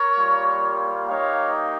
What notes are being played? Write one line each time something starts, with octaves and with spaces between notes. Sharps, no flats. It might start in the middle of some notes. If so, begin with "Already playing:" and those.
Already playing: A#4 C#5
G3 A#3 F4
A#3 D#4 G4 C#5 F5